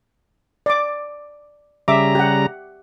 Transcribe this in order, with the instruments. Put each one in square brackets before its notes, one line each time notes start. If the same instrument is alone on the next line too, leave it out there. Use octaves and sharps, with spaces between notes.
[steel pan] D5 D6
[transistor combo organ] C#3 G3 A#5 [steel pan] E5 D6
[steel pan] G4 F#5